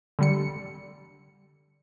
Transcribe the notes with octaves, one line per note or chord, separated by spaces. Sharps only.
D3 G3 C#7